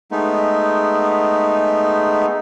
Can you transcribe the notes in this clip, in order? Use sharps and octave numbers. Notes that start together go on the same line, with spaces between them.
G#3 A3 B3 D#4